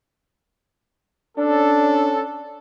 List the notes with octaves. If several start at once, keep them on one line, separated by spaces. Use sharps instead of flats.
C#4 D4 A4